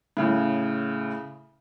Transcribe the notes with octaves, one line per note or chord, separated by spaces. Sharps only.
A2 C#3